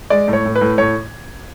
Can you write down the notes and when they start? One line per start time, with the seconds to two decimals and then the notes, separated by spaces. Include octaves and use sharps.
0.10 G#3 D5
0.28 A2
0.33 C#5
0.45 A2
0.55 B4
0.61 A2
0.78 A2 C#5